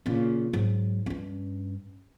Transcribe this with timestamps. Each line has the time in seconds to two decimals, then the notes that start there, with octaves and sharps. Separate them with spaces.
0.06 A#2 C#3
0.53 G#2 F#3
1.06 G2 C#4